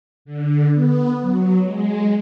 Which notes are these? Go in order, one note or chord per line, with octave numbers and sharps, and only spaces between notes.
D3
B3
F#3
G#3